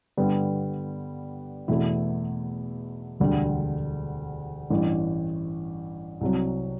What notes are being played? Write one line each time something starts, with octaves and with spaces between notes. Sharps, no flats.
G2 D3 G3 B3
E2 B2 A3 E4
E1 D2 D3 G3
A1 G2 E3
C2 C3 F#3